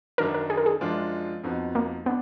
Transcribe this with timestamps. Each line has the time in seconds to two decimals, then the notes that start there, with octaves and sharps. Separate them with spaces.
0.18 F#2 D#3 F#3 D4 A#4
0.34 A#4
0.50 G#4
0.57 A#4
0.66 G#4
0.81 F#2 F3 G#3 D4 F4
1.44 F2 F3 B3 D#4 F#4
1.75 A#3
2.06 B3 D4